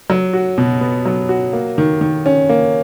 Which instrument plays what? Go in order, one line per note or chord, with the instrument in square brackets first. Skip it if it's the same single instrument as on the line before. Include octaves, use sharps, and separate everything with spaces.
[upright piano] F#3
F#4
B2
B3
F#3
F#4
A#3
D#3
D#3
C#4
A#3